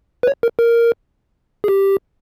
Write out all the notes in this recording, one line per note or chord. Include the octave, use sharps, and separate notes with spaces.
B4
C#5
A#4
A#4
G#4
G4